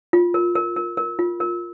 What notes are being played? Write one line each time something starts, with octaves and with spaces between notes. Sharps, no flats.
F4
A#4
A#4
A#4
A#4
F4
A#4